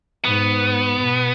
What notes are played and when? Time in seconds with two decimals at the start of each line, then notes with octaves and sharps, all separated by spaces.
0.25 G#2 B3
0.99 B2